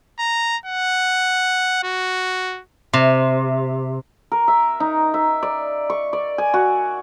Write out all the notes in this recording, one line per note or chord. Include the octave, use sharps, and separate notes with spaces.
A#5
F#5
F#4
C3
A#4
E5
D#4
E5
D5
C#6
D5
G#5
F#4